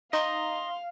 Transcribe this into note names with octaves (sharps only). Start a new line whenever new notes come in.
D#4 D#5 F5 C6